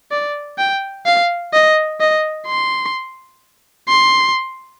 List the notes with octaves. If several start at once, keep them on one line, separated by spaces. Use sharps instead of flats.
D5
G5
F5
D#5
D#5
C6
C6